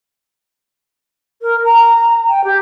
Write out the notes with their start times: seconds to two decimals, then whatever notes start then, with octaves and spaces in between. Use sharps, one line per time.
1.41 A#4
1.64 A#5
2.28 G5
2.44 G4